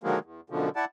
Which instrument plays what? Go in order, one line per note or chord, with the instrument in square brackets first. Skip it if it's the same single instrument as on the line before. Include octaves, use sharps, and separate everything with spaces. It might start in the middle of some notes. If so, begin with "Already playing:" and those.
[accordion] D3 D#3 F3 F#3 G#3 A#3
E2
F#2 B2 D3 F3
E4 D5 F#5 A5